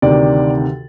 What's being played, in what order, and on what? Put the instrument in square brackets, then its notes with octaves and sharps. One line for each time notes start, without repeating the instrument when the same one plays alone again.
[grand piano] D2 C3 D#3 D5